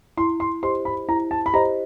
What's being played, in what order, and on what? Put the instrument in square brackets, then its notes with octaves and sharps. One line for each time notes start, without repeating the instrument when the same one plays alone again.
[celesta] E4 [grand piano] C6
[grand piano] C6
[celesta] G4 C5 D#5 [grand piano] C6
[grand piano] B5
[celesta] E4 [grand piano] A#5
[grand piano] A5
B5
[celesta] G4 C5 D#5 [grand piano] A#5